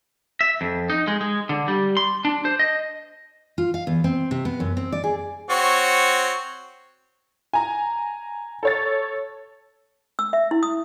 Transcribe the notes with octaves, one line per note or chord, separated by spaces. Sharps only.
E5
F2
D#4
G#3
G#3
D3
G3
C6
D4
C5
D#5
F4
F5
E2
C4
C3
B3
F#2
C4
D5
G#4
C4 F#4 C#5
G#5 A#5
A4 C#5 A6
E6
E5
E4
D#6